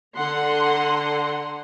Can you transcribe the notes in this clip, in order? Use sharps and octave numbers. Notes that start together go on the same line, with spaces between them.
D3 F#5 A#5 C6